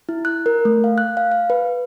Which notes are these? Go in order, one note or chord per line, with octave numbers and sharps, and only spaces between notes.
E4
F#6
A#4
A3
F5
F#6
F5
F5
B4